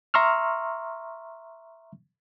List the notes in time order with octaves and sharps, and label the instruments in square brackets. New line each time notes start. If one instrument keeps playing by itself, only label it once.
[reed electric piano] E5 A#5 C6 C#6 E6 F6